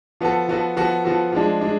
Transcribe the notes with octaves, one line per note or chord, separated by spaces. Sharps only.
F3 B3 F#4 A4
F3 B3 F#4 A4
F3 B3 F#4 A4
F3 B3 F#4 A4
F3 G#3 D4
G#3 D4